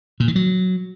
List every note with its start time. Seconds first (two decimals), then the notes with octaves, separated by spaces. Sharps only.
0.20 A#2
0.28 D#3
0.36 F#3